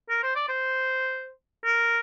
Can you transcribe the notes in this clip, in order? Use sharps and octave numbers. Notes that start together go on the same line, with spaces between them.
A#4
C5
D5
C5
A#4